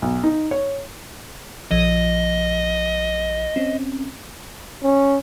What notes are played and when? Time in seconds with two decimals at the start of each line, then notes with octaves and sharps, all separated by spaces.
0.02 B1
0.23 D#4
0.51 C#5
1.71 A#1 F3 D#5
3.56 C4 C#4
4.84 C#4